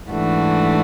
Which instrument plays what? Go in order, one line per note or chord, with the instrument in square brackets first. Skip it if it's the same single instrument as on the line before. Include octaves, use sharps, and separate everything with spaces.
[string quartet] G#2 E3 A3 D4 F#4